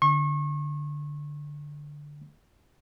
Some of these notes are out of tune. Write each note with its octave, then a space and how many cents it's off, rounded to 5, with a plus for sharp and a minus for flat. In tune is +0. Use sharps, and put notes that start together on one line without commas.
D3 +0 C#6 -35